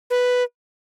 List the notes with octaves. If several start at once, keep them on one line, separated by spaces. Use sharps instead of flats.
B4